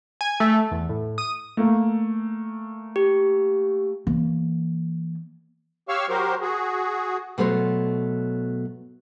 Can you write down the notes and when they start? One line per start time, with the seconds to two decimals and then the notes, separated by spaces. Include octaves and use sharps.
0.21 G#5
0.40 A3
0.71 E2
0.89 A2
1.18 D#6
1.57 A3 A#3
2.96 G4
4.07 E3 A#3
5.89 G4 C#5 F5 C#6 E6 F6
6.09 F#3 F#4 G4 A#4 C5
6.41 F#4 G#4
7.38 B2 F#3 A3 C5 C#5